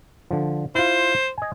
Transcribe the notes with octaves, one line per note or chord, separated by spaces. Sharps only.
D3 F3
E4 F4 C5
D#5 G#5